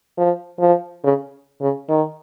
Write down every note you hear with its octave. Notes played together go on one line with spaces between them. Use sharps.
F3
F3
C#3
C#3
D#3